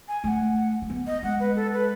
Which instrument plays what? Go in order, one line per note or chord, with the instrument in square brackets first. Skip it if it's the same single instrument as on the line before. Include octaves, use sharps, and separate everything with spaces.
[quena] G#5
[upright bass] A3 [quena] G#5
[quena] F#5
[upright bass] A3
B3
[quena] D#5
[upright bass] G#3 [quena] F#5
[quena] B4
A4
B4